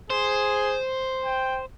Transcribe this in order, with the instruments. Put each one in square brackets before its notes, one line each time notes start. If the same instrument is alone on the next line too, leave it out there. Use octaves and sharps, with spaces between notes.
[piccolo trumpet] G#4 [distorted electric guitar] C5
[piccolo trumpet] G5